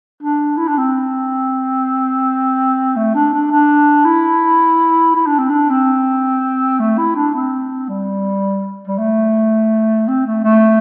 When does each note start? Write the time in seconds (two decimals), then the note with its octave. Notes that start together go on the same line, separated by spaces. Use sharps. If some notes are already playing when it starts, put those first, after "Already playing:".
0.23 D4
0.57 E4
0.68 D4
0.78 C4
2.96 A3
3.15 D4
3.33 D4
3.51 D4
4.05 E4
5.15 E4
5.26 D4
5.38 C4
5.50 D4
5.70 C4
6.79 A3
6.98 E4
7.15 D4
7.34 C4
7.89 G3
8.87 G3
8.98 A3
10.08 C4
10.26 A3
10.44 A3